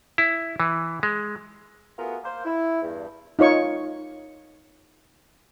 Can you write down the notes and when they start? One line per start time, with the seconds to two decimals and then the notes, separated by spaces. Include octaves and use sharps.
0.18 E4
0.60 E3
1.03 G#3
1.98 A3 B3 F4 F#4 G#4 A#4
2.23 A#3 C5
2.45 E4
2.82 E2 G2
3.39 D#4 F4 C#5 C#6